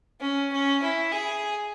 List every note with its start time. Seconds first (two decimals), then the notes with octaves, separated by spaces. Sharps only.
0.20 C#4
0.52 C#4
0.82 E4
1.12 G#4